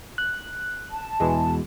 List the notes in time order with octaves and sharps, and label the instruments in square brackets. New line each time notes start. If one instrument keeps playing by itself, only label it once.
[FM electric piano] F#6
[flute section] A5
[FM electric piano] E2 [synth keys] B2 E3 G#3